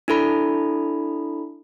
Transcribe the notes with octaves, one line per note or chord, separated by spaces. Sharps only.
D4 E4 A4 B5